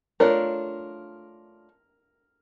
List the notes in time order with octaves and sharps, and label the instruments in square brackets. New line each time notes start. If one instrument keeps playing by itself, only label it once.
[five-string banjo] A3 D4 F4 A4 C#5 [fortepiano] A#4